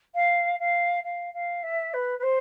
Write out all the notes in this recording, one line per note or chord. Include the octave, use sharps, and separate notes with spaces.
F5
F5
F5
F5
E5
B4
B4
C5